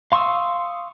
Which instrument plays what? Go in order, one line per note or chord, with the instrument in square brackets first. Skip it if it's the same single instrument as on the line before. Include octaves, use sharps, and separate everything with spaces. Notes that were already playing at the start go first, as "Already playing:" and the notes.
[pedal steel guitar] F5 C6 C#6 D#6 E6